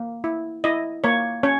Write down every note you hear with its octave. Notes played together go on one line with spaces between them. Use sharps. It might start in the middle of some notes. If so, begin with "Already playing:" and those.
Already playing: A#3
E4
E4 D#5
A#3 C#5
C#4 C#5